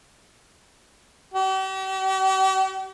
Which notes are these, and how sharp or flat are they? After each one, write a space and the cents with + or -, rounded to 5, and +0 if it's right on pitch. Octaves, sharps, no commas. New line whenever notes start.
G4 -45